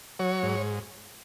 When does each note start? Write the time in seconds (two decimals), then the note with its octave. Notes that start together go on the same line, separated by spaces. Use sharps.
0.19 F#3 C#5
0.43 G#2